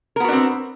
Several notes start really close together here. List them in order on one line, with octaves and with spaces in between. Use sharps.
A#4 B3 F#4 D4 C4